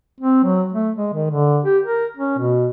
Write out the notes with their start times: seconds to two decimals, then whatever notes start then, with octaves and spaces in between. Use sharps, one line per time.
0.21 C4
0.44 F#3
0.73 A3
0.96 G#3
1.14 D#3
1.31 D3
1.65 G4
1.85 A#4
2.17 C#4
2.39 B2